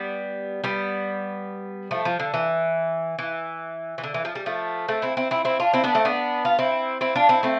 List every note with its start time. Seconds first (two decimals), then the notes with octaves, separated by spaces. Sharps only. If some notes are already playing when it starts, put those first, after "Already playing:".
Already playing: G3 B3
0.64 G3 B3
1.91 F3 A3
2.05 F3
2.20 D3
2.34 E3
3.19 E3
3.98 E3
4.03 D3
4.14 E3
4.25 F3
4.35 G3
4.46 F3 A3
4.88 A3 C4
5.02 C4 E4
5.17 C4 E4
5.31 C4 E4
5.45 C4 E4
5.60 D4 F4
5.73 C4 E4
5.84 B3 D4
5.95 A3 C4
6.05 B3 D4
6.45 F4
6.59 C4 E4
7.01 C4 E4
7.15 D4 F4
7.29 C4 E4
7.43 A3 C4